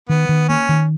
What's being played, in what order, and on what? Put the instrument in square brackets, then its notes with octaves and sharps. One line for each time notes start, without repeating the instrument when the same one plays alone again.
[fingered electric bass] D#3 [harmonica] B3
[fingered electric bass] D#3
[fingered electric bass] A#3 [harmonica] C#4
[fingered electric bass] D#3